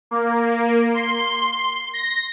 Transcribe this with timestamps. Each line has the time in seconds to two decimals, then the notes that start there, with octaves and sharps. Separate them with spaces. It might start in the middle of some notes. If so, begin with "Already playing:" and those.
0.11 A#3
0.94 C6
1.94 A#6